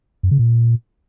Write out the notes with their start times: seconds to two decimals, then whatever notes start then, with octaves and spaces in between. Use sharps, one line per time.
0.23 F#2
0.31 C#3
0.39 A#2